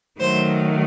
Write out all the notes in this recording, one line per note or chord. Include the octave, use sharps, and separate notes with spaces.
D#3 F#3 A3 C5